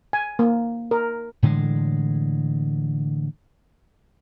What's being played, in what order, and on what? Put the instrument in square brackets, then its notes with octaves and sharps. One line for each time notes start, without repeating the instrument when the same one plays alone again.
[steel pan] G#5
A#3
A#4
[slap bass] A2 D3 E3 G#3